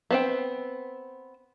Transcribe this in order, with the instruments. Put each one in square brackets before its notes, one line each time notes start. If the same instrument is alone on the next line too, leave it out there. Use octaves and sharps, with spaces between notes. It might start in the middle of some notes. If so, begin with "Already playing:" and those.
[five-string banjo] B3 C4 G5